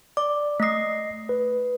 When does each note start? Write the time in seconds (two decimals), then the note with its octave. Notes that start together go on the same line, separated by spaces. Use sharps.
0.17 D5 D6
0.60 A3 D#5 D#6 A#6 C7
1.29 B4